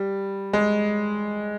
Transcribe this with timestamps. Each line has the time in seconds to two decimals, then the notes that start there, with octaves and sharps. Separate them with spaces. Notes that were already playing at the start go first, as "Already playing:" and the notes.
Already playing: G3
0.53 G#3